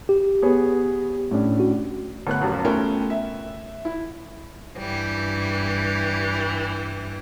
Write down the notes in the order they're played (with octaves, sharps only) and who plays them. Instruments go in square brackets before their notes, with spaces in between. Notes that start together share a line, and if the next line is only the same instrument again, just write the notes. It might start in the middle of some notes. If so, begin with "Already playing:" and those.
[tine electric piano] G4
[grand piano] B3 G#4 C#5
A2 C#4 D4
[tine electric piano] F#4
[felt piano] G1 A3 B3 F#5 F#6
D#1 B1 F#2 G4
A3 B3 C#4 F4 A#4 G5
E5
E4
[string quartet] G2 E3 G3